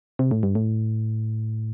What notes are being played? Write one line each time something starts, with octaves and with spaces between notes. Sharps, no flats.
C3
A2
G2
A2